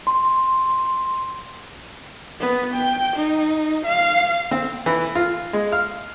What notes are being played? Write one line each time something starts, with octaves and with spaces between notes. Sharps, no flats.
C6
B3
G5
D#4
F5
C4
E3
F4
G#3
F5